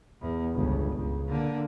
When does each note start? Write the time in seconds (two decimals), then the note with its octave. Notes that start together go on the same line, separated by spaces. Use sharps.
0.21 E2
0.54 G1 C#2
0.96 C#2
1.29 D3 A#3